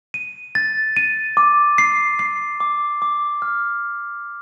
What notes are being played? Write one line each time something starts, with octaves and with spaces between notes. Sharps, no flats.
D#7
A6
D#7
D6
C7
C7
D6
D6
F6